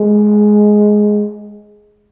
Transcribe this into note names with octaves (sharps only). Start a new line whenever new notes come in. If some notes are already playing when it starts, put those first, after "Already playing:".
Already playing: G#3